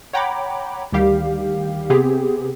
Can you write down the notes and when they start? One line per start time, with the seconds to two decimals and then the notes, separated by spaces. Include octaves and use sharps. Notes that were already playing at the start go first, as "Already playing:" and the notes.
0.13 C#5 F#5 G5 A#5 B5 D6
0.92 D2 D#3 G3 G4 F5
1.90 C3 B3 C4 G4 G#4